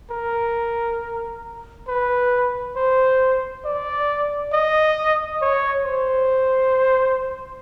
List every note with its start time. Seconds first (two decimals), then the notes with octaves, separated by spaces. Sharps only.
0.11 A#4
1.88 B4
2.76 C5
3.65 D5
4.53 D#5
5.42 C#5
5.85 C5